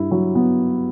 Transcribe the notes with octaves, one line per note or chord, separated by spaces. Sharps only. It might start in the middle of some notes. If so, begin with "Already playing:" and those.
Already playing: G2 E4
F#3
B3